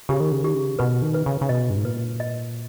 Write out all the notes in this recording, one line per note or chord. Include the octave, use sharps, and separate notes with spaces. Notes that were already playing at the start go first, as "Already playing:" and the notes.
C#3 G4
D#3
C#3
D#3 G4
C#3
B2 B4
D#3
B4
C#3
C#3
B2 D#5
G2
G#2
A#2 B4
D#5